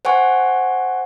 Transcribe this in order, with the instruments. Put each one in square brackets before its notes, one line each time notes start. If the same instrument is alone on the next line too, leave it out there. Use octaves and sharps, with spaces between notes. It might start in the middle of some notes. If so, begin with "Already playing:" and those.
[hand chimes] C5 F#5 G#5 C#6